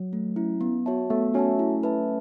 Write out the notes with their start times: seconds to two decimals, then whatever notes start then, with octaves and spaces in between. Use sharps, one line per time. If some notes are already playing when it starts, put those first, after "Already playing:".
Already playing: F#3
0.13 A3
0.36 C#4 E4
0.61 B3
0.86 F#4 C#5 E5 A5
1.10 A3 B3
1.34 C#4 F#4 C#5 E5 A5
1.59 E4
1.83 B4 E5 A5